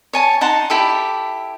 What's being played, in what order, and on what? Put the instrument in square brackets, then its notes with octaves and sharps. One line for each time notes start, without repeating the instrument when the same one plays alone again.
[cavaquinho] C#5 G#5 A5
D#4 F#5 A5 C6
E4 G4 A4